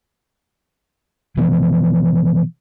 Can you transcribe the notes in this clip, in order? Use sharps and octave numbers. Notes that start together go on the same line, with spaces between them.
B2 E3 F3 B3